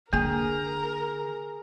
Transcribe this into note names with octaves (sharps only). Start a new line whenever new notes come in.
D3 A#3 G#4 A#4 G#5 A#5